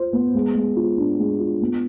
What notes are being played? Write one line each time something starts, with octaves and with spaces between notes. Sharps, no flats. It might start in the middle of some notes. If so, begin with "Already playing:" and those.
Already playing: F4 C5
B3
G#3
G#3
F4
D4
G#3
F4
B3